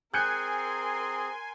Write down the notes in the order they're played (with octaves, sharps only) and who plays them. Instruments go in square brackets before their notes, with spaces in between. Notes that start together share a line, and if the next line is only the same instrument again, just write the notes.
[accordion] C4 G#4 [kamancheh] A#4 C6 [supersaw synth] G#5 [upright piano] F#6 G6 C#7